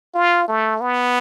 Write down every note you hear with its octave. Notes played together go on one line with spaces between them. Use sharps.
F4
A3
B3